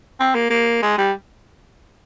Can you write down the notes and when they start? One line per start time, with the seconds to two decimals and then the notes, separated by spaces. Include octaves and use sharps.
0.20 C4
0.35 A#3
0.50 A#3
0.82 G#3
0.98 G3